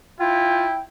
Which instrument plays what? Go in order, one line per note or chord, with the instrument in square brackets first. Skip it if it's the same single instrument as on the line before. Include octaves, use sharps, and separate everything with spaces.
[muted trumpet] E4 [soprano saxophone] F4 [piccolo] G5